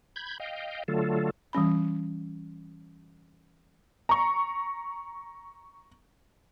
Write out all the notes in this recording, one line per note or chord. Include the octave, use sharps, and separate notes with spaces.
B5 G6 G#6
D#5 F5 G5
D3 F#3 A3 F4 A4
E3 G3 C#4 B5
A#5 C#6